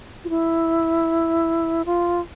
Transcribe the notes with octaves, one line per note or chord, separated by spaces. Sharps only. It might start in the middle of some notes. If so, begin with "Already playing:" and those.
F4
E4
F4